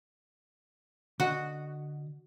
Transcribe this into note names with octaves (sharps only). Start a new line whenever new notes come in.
D3 F#4 D#5